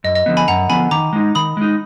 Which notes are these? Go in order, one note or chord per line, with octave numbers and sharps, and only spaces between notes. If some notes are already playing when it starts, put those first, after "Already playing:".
F#2 D#5
D#5
D3 F3 B3
G#5 B5
F#2 F#5 A#5
D3 F3 B3 G#5 B5
D#3 A#5 D6
G#3 D#4
D#3 B5 D#6
G#3 D#4